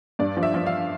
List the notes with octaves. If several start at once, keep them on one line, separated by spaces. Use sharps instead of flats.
G2 D5
F3
E5
F3
F5